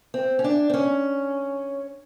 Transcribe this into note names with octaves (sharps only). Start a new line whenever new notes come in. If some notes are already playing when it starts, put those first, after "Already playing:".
C4
C#4
D4
C4
C#4